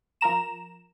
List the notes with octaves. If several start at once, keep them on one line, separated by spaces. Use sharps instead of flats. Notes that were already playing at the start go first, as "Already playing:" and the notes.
F3 A#4 A#5 E7